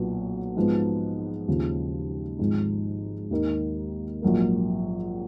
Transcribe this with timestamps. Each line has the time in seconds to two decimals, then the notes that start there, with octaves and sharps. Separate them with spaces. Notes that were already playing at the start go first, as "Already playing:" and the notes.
Already playing: B1 A#2 F#3 B3
0.56 G#2 F3 B3
1.48 D#2 C#3 F3
2.39 G#1 G#2 F3
3.31 D#2 D#3 A#3
4.22 A#1 G#2 F#3 A#3